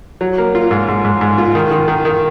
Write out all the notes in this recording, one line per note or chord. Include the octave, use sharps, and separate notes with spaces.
F#3
A#3
F4
G#2
G#2
G#2
G#2
F4
D#3
D#3
D#3
D#3